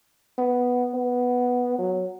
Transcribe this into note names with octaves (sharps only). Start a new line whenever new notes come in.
B3
B3
F#3